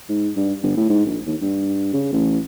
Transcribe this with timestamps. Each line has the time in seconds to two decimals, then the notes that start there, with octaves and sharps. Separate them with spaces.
0.09 G#2
0.36 G2
0.63 G1
0.77 A2
0.89 G#2
1.06 A#1
1.26 D#2
1.42 G2
1.93 C#3
2.12 A1